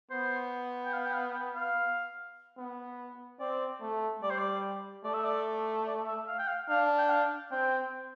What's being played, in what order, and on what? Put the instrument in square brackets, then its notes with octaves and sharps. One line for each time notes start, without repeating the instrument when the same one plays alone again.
[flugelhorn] B3 [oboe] C5
[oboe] G5
F5
G5
F5
G5
F5
[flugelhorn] B3
[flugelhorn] C4 [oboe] D5
[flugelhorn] A3
[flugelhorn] G3 [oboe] D5
[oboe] C5
D5
[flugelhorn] A3 [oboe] D5
[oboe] E5
D5
D5
E5
F5
G5
F5
[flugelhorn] D4 [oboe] F5
[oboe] G5
F5
[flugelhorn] C4 [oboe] G5